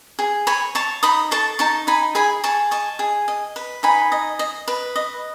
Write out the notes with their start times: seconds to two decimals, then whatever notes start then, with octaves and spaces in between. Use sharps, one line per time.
0.19 G#4
0.47 C#5 G#5 B5
0.75 C#5 A5 C#6
1.03 D#4 B5 D#6
1.31 A4 A5 C#6
1.59 D#4 A5 C#6
1.87 D#4 G#5 B5
2.15 G#4 G#5 B5
2.44 G#4 A5 C#6
2.71 D#5 A5 C#6
2.99 G#4
3.28 D#5
3.56 B4
3.83 D#4 G#5 B5
4.12 D#5
4.39 D#5
4.68 B4
4.96 D#5